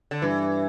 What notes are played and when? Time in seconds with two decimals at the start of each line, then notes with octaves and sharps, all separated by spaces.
0.11 D3
0.22 G2 E3